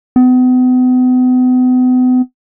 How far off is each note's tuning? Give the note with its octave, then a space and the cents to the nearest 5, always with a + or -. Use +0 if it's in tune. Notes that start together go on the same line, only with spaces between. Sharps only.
B3 +40